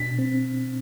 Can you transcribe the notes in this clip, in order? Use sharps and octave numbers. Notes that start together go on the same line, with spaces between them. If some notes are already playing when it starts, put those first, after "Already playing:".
Already playing: B2 D4 B6
C4